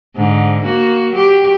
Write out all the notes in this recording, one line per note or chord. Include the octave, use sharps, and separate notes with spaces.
G#2 D3
A#3 F#4
F#3 G4